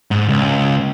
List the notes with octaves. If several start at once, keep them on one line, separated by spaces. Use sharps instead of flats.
G#2
C#2